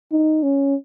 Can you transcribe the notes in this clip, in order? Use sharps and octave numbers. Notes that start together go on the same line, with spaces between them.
D#4
C#4